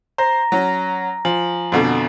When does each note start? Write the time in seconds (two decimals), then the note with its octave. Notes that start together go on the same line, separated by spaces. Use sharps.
0.18 C5 A#5 A#6
0.52 F#3 C#4
1.25 F3 G#5 F#7
1.72 F2 B2 D3